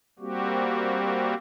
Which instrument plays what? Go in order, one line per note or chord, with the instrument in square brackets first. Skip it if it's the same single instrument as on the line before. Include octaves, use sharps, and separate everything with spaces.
[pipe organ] G3 A#3 C4 F#4 G4